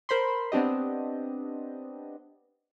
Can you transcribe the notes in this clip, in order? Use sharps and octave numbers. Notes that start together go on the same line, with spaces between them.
A#4 C5 B5 C6
B3 C4 D4 G4 D#5